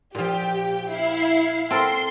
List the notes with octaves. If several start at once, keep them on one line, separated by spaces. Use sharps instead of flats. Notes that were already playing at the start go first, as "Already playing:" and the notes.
A#2 F3 G4 G5
E4 F5 C7
C4 A4 A#4 C6